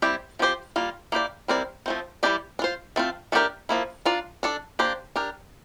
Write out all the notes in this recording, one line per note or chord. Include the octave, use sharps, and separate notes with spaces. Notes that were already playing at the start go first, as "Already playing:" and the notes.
G3 C4 E4 G4
F3 C4 G4 C5
G3 A#3 F4
A#3 E4 G4 D5
G3 C4 E4 A#4 D5
F3 A3 C4
E3 G3 D4 G4 D5
D4
F4 C5
A3 C4 F4
A3 D4 G4 A#4 D5
F3 A#3 E4
D4 F4 A#4 D5
D4 A4 D5
A#3 D4 G4 C5
D4 G4 A#4